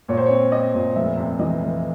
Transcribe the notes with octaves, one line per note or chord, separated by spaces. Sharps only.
A#2 C#5
C5
C4 C#5
C4 D#5
A#2
F1 E5
C3
E3 D#5
F1